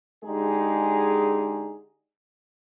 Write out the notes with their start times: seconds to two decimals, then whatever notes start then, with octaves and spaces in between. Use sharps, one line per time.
0.24 D3 G#3 D#4 G4 G#4